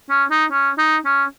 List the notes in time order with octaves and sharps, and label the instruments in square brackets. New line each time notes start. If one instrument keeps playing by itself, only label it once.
[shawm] C#4
D#4
C#4
D#4
C#4